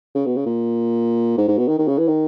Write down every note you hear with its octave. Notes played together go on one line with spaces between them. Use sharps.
C#3
B2
C#3
A#2
G#2
G#2
B2
D#3
D#3
C#3
E3
D#3